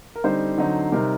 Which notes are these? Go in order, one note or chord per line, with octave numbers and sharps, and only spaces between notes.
A#4
D3 G3 C4 D#4 C5
D3 F#3 C4 D#4
C3 G3 C4 D#4 A#4